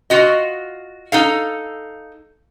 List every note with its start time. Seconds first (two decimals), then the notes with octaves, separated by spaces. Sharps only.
0.10 F4 F#4 D#5
1.12 D#4 A4 F5